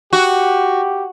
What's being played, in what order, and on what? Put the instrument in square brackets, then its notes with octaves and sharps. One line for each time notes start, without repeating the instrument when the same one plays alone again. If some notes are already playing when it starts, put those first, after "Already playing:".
[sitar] F#4 [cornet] G4